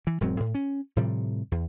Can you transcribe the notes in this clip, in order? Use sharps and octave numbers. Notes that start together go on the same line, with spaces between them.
E3
E1 G#2 F#3 C4
A2
C#4
A2 C3 F3 G3
E2